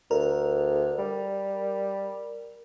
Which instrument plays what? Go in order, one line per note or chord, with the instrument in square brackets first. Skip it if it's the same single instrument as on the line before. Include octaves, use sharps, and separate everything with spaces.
[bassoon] D2 [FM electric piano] A#4
[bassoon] G3